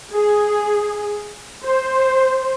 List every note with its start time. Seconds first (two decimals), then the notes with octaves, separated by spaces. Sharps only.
0.11 G#4
1.64 C5